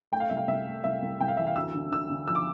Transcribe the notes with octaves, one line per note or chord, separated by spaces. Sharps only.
A3 G5
F5
C2 E5
F5
C2 E5
A3
C2 E5
C2
C2 G5
F5
E3 E5
F5
D2 E6
D3
D3 E6
D3
F3 E6
D6